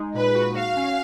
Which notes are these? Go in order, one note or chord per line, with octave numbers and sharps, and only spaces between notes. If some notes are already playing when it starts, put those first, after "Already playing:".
Already playing: G#3 D#4
A#2 B4
F#4
F#4 F5
C#4